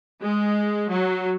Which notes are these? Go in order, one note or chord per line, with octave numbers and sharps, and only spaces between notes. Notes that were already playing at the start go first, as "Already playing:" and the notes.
G#3
F#3